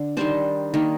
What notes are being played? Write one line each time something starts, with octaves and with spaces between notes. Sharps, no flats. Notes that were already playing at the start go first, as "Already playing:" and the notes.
Already playing: D3
D#3 G3 D4 C5
D#3 A#3 D4